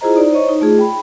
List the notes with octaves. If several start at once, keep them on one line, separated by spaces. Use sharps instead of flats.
E4 F4 G#4 C5 D#5 A#5
D#4 D5
C5 C#5 D#5 C#6
D#4
A3 F4 G#4
G5 B5